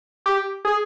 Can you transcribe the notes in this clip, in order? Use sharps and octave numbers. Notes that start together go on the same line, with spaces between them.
G4
G#4